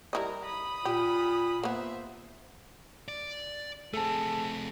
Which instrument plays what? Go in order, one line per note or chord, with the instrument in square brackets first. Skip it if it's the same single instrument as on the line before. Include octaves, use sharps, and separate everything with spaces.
[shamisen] G3 E4 D#5 [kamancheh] A#4 A#5
[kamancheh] B5 D#6
[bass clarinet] A#2 [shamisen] G4
[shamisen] A#3 B3 [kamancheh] C5 E5
[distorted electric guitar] D5
[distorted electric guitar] A3 C4 [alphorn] G#4 [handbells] A4 A5